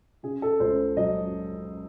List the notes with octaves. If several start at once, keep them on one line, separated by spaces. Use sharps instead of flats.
C#3 G#4
A4
C#2 C5
F#3 D#5